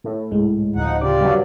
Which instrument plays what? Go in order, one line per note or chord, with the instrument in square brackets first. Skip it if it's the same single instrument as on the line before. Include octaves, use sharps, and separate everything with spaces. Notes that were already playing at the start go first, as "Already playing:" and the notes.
[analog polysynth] A2
[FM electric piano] C2 G#2 G#3
[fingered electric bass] D1 [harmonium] F3 D#4 F#5
[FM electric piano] C#3 D6 [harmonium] F4 G4 D5
[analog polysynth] G2 F#3